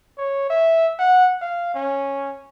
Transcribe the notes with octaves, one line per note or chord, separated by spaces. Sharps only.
C#5
E5
F#5
F5
C#4